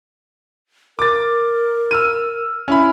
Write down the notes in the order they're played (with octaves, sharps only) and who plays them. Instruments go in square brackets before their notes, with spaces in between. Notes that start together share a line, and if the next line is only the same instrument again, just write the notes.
[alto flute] A#4 [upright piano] D6 A6
[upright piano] E6 F6 D#7
C#4 E4 B5